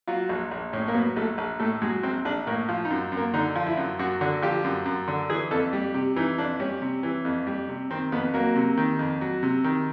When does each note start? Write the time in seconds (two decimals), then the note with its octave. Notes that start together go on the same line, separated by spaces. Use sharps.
0.07 F#3 F4
0.29 A#1
0.51 A#1
0.73 A2 C#4
0.88 A#3
0.94 F#3 B3
1.16 A#1 A3
1.38 A#1
1.60 A2 A3
1.82 F#3 G#3
2.03 A#1 C4
2.25 A#1 D4
2.47 A2 A#3
2.69 F3
2.85 D#4
2.90 F#2
3.12 F#2
3.17 A#3
3.34 D3 D#4
3.56 F3
3.66 E4
3.77 F#2
3.99 F#2 F#4
4.21 D3 F#4
4.42 F3 G4
4.64 F#2
4.86 F#2
5.08 D3
5.30 E3 G#4
5.51 F2 A4
5.73 G3
5.94 C3 G4
6.16 E3 D#4
6.38 F2 D4
6.60 G3 C#4
6.82 C3
7.03 E3
7.25 F2
7.47 G3
7.69 C3
7.91 D#3 C4
8.12 F2 B3
8.34 F#3 A#3
8.56 C3
8.77 D#3
8.99 F2
9.21 F#3
9.43 C3
9.64 D#3